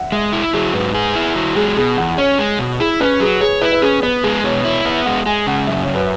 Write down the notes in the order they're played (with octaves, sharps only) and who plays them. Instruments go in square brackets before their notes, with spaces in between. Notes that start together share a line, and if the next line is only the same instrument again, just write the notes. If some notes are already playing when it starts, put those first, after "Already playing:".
Already playing: [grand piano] E5 F#5
[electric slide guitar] G#3 [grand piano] E5
[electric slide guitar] E4
[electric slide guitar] F#3 [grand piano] G#4
[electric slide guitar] G#2 [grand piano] B4
[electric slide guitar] G#4
E4
F#3
[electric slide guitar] G#3 [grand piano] G#4
[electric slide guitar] B2 [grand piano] G#4
[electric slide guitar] E2 [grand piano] F#5
[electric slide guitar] C#4 [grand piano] C#5
[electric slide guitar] G#3
B2
[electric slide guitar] E4 [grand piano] G#4
[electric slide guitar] C#4 [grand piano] B4
[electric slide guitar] F#3 [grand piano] G#4
[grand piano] G#4 [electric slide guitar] C#5
[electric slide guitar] E4 [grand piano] B4
[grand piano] B4
[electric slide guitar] C#4 [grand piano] G#4
[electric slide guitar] B3 [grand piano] B4
[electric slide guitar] G#3 [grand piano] G#4
[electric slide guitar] B2 [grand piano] C#5
[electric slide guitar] E4 [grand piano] C#5
[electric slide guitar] B3 [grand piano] E5
[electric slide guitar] G#3 [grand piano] F#5
[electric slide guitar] G#3 [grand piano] G#5
[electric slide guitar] C#3 [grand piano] F#5
[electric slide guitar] F#2 [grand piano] E5
[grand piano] C#5
[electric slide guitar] F#2
[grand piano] B4